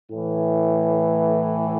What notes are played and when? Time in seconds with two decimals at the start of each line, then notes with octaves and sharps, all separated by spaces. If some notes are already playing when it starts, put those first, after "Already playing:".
0.10 A2 E3